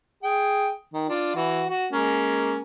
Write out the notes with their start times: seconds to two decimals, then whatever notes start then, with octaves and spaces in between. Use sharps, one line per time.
0.23 G#4 G5
0.94 D#3
1.09 D4 F4
1.35 E3 F#4
1.70 F#4
1.92 G#3 A#3 C#4